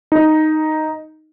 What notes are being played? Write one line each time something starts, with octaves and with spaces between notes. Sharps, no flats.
D#4